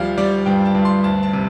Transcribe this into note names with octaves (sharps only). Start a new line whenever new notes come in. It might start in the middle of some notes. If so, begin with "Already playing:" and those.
Already playing: D2 F3 G3 F5
G3 D5
G2 G5
A5
G2
C6
D2 A5
A5
C3